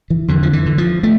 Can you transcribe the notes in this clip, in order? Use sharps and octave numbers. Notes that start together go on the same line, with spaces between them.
E3
F2 D3
F3
E3
D3
F3
A3